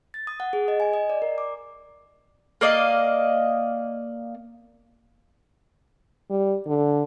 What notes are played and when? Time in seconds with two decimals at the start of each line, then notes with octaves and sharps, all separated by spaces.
0.14 A6
0.27 D#6
0.40 F#5
0.53 G#4
0.68 D#5
0.80 G#5
0.94 D#5
1.10 D5
1.22 A#4
1.38 D6
2.61 A#3 D5 D#5 F5
6.30 G3
6.67 D3